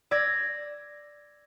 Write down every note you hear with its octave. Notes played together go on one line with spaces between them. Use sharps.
D5 E6 G#6 A#6